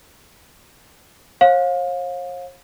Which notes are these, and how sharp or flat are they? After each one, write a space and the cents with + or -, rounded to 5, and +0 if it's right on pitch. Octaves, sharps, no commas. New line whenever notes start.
C#5 -45 F5 +25